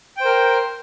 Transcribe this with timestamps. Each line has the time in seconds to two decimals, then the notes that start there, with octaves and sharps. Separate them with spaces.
0.17 G5
0.21 C5
0.25 A#4